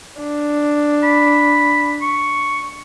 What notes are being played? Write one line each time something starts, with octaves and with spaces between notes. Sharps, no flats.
D4
B5
C#6